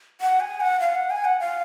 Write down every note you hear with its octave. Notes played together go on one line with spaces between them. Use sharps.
F#5
G#5
F#5
F5
F#5
G#5
F#5
F5